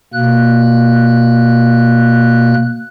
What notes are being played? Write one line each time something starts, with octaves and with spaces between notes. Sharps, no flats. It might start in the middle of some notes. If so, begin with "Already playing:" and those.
B2 A#3 F#6